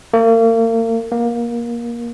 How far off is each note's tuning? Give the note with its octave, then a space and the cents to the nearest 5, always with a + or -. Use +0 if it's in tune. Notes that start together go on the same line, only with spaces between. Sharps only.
A#3 -40
A#3 +20